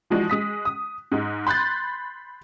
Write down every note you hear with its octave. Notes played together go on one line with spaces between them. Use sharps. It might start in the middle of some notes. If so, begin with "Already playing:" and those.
E3 F3 G#3 D4 F#4
G#3 D#6 B6
D#6
G#2 G#3
B5 C6 F#6 G6 A6